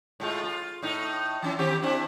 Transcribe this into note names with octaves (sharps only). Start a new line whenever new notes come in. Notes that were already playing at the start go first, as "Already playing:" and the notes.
A2 G#3 F4
F4
A2 D#4
E3 C#4 E4
D#3 C4 G4
C4 D4 E4